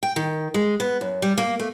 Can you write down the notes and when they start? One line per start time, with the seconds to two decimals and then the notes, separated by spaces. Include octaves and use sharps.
0.03 G5
0.16 D#3
0.54 G#3
0.80 B3
1.01 F#2
1.22 G3
1.38 A#3
1.60 A3